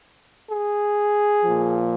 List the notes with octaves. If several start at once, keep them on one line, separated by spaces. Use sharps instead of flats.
G#4
A#2 F3